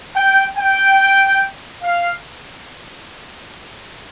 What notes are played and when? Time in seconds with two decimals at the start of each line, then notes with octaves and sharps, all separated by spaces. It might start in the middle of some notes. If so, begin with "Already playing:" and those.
0.15 G5
0.56 G5
1.81 F5